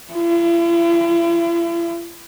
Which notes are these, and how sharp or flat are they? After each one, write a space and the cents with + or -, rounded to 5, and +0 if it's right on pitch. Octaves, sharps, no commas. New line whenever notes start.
E4 +45